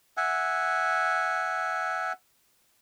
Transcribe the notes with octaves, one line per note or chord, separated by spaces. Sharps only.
E5 F#5 G#5